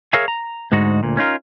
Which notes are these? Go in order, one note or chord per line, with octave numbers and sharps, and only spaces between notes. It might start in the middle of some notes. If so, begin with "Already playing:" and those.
G#4 A#4 C#5 E5 F5 G#5
A#5
D2 G#2 G#3 D#4 F#4
D2 A#2
C#4 D#4 F4 A#4